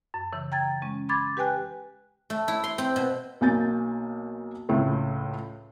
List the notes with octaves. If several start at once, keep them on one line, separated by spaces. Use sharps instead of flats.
F#2
C#3 E3
G5 A#5 G#6 A6
G#3 C#4
B5 C6 D6 G#6 A6
G4 B4 G5 G#5 F#6
A3
E4
C6
C4
B2
B1 A#3 G#5 G6 A6
C#2 A2 A3